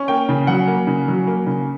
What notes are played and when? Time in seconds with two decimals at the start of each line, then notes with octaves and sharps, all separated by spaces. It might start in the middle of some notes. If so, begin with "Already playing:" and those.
Already playing: C#4
0.08 A#3 G5
0.29 C#3
0.47 F#3 F#5
0.68 A#3
0.87 C#3
1.08 F#3
1.27 A#3
1.47 C#3